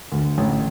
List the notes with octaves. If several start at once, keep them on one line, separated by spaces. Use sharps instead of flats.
D2
A1